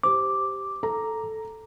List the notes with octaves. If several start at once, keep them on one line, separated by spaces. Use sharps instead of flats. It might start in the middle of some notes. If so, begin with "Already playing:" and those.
G4 C5 D6
A4 A#5